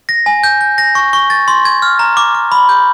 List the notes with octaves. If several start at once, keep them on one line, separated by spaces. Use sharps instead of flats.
A#6
G#5
G6
G6
A#6
C#6
C#6
A6
C6
G#6
F6
A#5
D6
D6
B5
G6